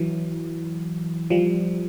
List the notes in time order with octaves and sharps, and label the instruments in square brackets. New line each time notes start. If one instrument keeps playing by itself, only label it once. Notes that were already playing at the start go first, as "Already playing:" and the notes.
Already playing: [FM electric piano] E3 F#3
F3 G3